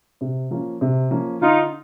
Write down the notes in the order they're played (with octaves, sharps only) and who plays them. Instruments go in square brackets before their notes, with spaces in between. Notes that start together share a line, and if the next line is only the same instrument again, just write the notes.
[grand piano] C3
F3 A#3 C#4
C3
F3 A#3 C#4
[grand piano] D3 [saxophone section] D#4 F4